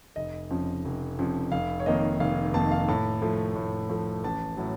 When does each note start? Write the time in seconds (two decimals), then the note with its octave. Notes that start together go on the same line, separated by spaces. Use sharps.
0.16 F1 D#5
0.51 F2 C#3 F3
0.85 F1
1.19 F2 C#3 F3
1.52 F1 F5
1.80 C#5
1.86 F2 D#3 A#3 D#5
2.20 F1 F5
2.53 F2 D#3 A#3 A5
2.71 F5
2.88 A2 A5
3.22 F3 A3
3.55 A2
3.90 F3 A3
4.23 A1 A5
4.57 A2 F#3